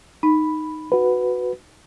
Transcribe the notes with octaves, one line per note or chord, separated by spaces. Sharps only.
D#4 B5
F#4 B4